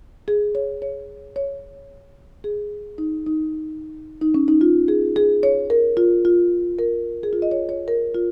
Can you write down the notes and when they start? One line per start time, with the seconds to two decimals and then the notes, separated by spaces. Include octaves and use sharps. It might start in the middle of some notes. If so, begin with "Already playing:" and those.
0.28 G#4
0.55 C#5
0.82 C#5
1.36 C#5
2.44 G#4
2.98 D#4
3.27 D#4
4.22 D#4
4.34 C#4
4.48 D#4
4.61 F4
4.88 G#4
5.16 G#4
5.43 C#5
5.70 A#4
5.97 F4
6.25 F4
6.79 A#4
7.23 G#4
7.33 F4
7.42 D#5
7.51 C#5
7.69 C#5
7.88 A#4
8.14 F4